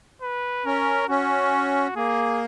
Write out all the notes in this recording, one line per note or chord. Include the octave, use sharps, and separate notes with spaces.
B4
C#4 A#4
C#4 F#4
A#3 G#4